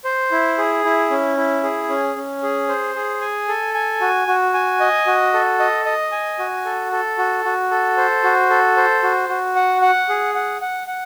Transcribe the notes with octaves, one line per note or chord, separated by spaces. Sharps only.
C5
E4
G#4
E4
C#4
E4
G#4
C#4
C#4
G#4
C5
G#4
G#5
A4
G#5
F#4
F#4
G#5
D#5
F#4
A4
D#5
D#5
G#5
F#4
A4
A4
F#4
F#4
A4
C5
F#4
A4
C5
F#4
F#4
F#5
F#5
G#4
F#5
F#5
F#5